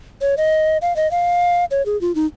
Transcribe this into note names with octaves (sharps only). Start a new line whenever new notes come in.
C#5
D#5
F5
D#5
F5
C#5
G#4
F4
D#4